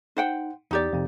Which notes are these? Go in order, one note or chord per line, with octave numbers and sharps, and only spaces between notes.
D#4 C5 F#5 G5
E2 D#4 G4 D5
F2 C3